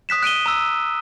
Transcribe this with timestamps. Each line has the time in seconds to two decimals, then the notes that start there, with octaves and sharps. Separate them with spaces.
0.09 D#6 F#6 B6 E7
0.22 F#6 D7 D#7 G7
0.46 A#5 E6